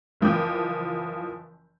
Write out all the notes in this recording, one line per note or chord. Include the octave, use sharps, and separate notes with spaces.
F#1 E3 F3 G5 D6 G6